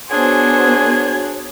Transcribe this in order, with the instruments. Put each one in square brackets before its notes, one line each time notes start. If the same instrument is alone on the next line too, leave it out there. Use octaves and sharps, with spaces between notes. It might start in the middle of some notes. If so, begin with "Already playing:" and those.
[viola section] B3 F#4 C5 [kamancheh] D4 G#4 [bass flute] C#5 [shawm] G#5